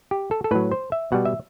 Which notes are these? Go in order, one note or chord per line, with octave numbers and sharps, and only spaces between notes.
G4
A4
A4
A2 F#3 B4
C5
E5
B2 G3 F#5
E5